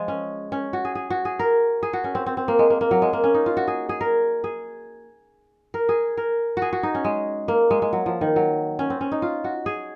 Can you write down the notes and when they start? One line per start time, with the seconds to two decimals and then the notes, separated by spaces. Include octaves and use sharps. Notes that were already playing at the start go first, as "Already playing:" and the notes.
Already playing: F3 G#3
0.08 C#4
0.52 C#4
0.73 F#4
0.85 G#4
0.95 G#4
1.10 F#4
1.25 G#4
1.39 A#4
1.83 G#4
1.93 F#4
2.04 C#4
2.15 C4
2.26 C4
2.37 C4
2.48 A#3
2.59 G#3
2.70 A#3
2.81 A#3
2.91 F#3
3.02 G#3
3.13 A#3
3.24 C#4
3.34 D#4
3.46 F4
3.57 F#4
3.68 G#4
3.89 G#4
4.01 A#4
4.44 G#4
5.74 A#4
5.89 G#4
6.17 A#4
6.57 F#4
6.62 G#4
6.73 F#4
6.83 D#4
6.95 C#4
7.04 G#3
7.48 A#3
7.71 G#3
7.82 G#3
7.93 F#3
8.06 F3
8.21 D#3
8.36 F#3
8.79 C#4
8.90 C4
9.01 C#4
9.12 D#4
9.22 F4
9.44 F#4
9.66 G#4